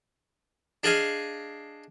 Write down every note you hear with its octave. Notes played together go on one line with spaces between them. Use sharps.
D4 G#4 D#5 F5 G#5